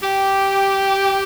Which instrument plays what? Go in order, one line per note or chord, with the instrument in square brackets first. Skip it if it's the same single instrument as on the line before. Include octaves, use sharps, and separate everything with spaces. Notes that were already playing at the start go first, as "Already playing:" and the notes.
[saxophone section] G4